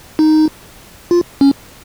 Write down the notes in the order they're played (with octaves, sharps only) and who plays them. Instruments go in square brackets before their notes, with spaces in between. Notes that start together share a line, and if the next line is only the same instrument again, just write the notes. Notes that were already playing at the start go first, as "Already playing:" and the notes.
[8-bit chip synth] D#4
F4
C#4